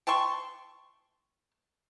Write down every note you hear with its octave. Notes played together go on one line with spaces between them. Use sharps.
G5 A5 C6 C#6